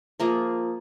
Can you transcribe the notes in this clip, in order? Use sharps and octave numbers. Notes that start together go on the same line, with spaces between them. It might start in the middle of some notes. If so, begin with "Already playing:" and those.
F3 A#3 F4 G#4